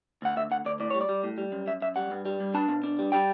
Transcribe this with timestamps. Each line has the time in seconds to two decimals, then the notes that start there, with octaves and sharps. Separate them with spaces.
0.22 D2 F#5
0.36 D2 E5
0.51 D2 F#5
0.65 D2 D5
0.80 A2 D5
0.90 G3 C#5
1.01 D5
1.09 G3
1.24 A2
1.38 G3
1.52 F#2
1.67 F#2 E5
1.82 F#2 E5
1.96 G3 F#5
2.11 G2
2.25 G3
2.40 G2
2.54 D4 A5
2.68 B2
2.84 D4
2.99 G3
3.12 G3 G5